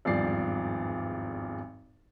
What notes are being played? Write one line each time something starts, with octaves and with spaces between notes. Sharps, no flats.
G#1 E2 G2 F3 D5 C7